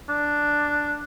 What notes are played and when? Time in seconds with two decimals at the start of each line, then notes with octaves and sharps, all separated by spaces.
0.09 D4